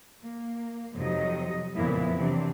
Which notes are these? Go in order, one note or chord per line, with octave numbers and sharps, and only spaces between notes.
A#3
F2 C3 F#3 D#4 D#5
F2 A#2 C#3 A#3 B3 E4
C3 E3 F#3 C4 D4